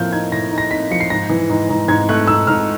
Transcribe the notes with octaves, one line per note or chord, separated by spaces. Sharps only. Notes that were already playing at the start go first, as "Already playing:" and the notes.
Already playing: A2 F3 A#3 F6 G6
D#4 G#6
A2 A#6
D#4
A#6
D#4 B6
F3 C#7
C7
G#2 A#6
E3
G#2
G#2
G#2 G#6
A3 F#6
G#2 E6
G#2 F6